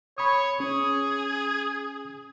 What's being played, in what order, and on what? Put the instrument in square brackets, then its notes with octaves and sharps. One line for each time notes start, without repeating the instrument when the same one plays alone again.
[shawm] C#5 [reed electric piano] B5 D#6
[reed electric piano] C#4 [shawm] G#4